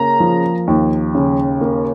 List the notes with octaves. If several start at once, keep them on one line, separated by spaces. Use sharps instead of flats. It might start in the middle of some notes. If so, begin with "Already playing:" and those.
Already playing: C#3 A#3 A#5
F3
D#2
C#3
A#3